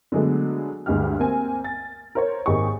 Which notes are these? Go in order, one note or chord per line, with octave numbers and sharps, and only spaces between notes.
D3 F#3 G#3 A3 B3
D2 G2 G#3 G4 F6
A#3 C4 G#5
A6
A#4 C5 C#5
G#1 A#3 D#4 G4 G#4 C#6